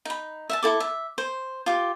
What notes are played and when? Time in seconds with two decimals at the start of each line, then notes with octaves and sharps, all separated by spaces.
0.05 D#4 B5
0.50 E5 F5 A5
0.63 E4 A4 D6
0.80 E5
1.18 C5
1.66 F4 G4